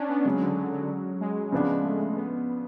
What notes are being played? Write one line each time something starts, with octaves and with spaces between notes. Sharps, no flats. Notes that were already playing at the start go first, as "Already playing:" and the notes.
Already playing: C#4 D4
B3
C#3 F#3 G#3 C#4
D3
F#3
F#3
G#3
C#3 F3 B3 D4
A3
B3